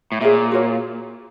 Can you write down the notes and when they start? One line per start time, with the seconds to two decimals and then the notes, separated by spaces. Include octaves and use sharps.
0.12 A2
0.21 A#2 G#4 C#5 E5
0.52 F#4 A#4 C#5